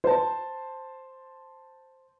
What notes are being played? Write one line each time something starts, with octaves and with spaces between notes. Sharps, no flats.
C5 A5